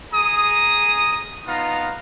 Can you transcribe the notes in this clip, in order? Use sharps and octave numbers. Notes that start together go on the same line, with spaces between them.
G#4 A#5 D#6
B3 D#4 F4 F5 A#5